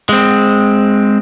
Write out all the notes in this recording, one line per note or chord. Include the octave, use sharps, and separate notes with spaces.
G#3 C4